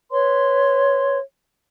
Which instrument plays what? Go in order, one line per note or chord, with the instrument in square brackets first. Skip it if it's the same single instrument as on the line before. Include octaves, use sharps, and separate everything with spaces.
[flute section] B4 C#5 C6